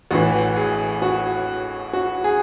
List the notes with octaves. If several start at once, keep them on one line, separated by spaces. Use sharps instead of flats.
A1 A2 E3 F#4
G#4
F#4
F#4
G#4